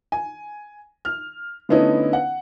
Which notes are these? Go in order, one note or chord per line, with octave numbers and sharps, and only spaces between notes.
G#5
F6
D3 A3 B3 C#4 D#4 E4
F#5